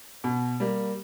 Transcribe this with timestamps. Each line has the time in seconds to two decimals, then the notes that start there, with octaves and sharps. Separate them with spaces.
0.24 B2
0.60 G3 A#3